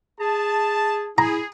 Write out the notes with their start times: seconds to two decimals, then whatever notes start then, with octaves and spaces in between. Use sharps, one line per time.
0.20 G#4 A5
1.18 E4 G#4 A#5